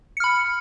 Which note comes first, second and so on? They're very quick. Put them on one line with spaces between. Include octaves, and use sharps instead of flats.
C#7 F6 B5